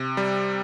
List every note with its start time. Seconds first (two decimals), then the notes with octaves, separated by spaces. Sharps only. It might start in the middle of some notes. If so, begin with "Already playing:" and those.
Already playing: C3
0.17 G3